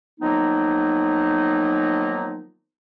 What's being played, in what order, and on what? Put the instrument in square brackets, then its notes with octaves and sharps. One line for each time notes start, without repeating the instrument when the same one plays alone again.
[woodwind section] D#3 F3 F#3 A#3 B3 D#4